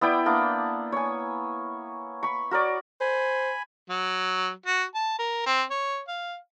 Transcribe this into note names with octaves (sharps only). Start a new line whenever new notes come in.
B3 E4 D5 G5
A#3 B3 D4
C#5 G#5
B5 C#6
F#4 A#4 C#5 D5
C5 G#5 B5
F#3
F#4
A5
A#4
C4
C#5
F5